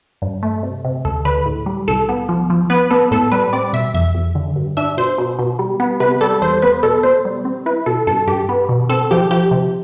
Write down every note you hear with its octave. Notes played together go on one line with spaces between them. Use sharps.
G2
A3
C3
C3
D2 A4
D3 B4
A2
G3
C2 A4
B3
F3
F3
B3 B4
B3 A4
A2 A4
G3 B4
C4 D5
B2 E5
F2 E5
F2
D3
G2
D4 E5
B2 C5
B2
B2
G3
B3
C3 B4
G3 A4
E2 C5
B3 B4
B2 A4
B2 C5
G3
C4
E4 B4
B2 A4
G2 A4
G2 G4
B3
B2
C4 A4
F3 G4
F3 G4
C3